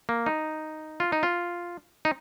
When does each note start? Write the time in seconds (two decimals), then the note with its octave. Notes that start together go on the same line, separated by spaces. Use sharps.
0.09 A#3
0.26 D#4
1.00 F4
1.12 D#4
1.23 F4
2.05 D#4